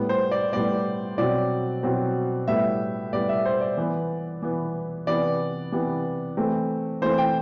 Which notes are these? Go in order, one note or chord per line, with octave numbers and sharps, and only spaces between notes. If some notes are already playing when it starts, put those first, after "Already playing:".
Already playing: A2 G3 B3
C5
D5
A2 G3 B3 D5
B2 F#3 C4 D5
B2 F#3 C4
A2 G3 B3 E5
A2 G3 B3 D5
E5
C5
D5
E3 B3
E3 B3
C3 E3 B3 D5
C3 E3 B3
E3 A3 C4
E3 A3 C4 C5
G5